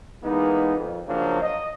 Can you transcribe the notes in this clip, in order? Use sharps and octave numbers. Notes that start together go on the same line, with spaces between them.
E3 G#3 A#3 B3 D#4
F2
C#3 F3 F#3 A#3 D4
D#5